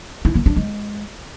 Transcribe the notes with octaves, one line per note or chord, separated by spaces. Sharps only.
E4
A#3
D4
G#3